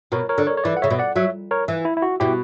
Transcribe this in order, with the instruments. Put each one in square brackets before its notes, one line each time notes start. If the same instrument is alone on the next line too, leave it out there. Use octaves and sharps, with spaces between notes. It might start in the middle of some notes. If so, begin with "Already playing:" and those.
[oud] B2 [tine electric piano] A#4 C#5
[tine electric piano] A#4 C#5
[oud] D3
[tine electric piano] A#4 C#5
C#5
[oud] E3 [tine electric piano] B4 D5
[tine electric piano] F#5
[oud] C#3 [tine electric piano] C#5 E5
[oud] B2
[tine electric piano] D5 F#5
[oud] F#3 [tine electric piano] C#5 E5
[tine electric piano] A#4 C#5
[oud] E3
[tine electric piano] E4
E4
F#4
[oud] B2 [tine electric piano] E4 G4